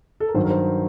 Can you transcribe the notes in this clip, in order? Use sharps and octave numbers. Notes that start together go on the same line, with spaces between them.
A4
A#4
G2 D#3 F#3 C5
A#4
C5